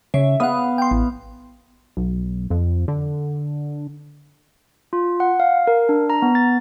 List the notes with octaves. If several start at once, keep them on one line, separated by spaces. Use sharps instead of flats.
C#3 C#5 E5
B3 F5 F#5 D#6
G5 C6
A1
B1
F2
D3
F4
F#5
F5
A#4
D4
A#5
B3
A6